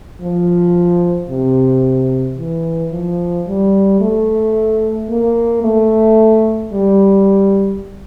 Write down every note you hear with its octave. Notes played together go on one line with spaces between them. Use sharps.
F3
C3
E3
F3
G3
A3
A#3
A3
G3